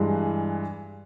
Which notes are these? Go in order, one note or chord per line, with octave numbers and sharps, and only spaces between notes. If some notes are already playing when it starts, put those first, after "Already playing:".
Already playing: G2 E3 G#3